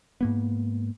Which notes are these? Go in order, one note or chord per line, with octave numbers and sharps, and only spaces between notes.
G#2 A#3 B3